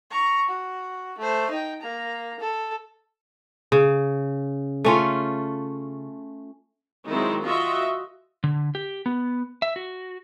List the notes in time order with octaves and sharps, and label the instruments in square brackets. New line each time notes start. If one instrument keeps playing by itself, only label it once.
[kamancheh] A#5 C#6
F#4
A3 C5
D#4 G5
A#3 A#5
A4
[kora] C#3
A3 C#4 F4
[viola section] D#3 F#3 G#3 C4 D#4 E4
F4 F#4 D#5 E5
[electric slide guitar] D3
G4
B3
E5
F#4